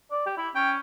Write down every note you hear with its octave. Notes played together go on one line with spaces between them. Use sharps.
D5
G4
E4
C#4 G5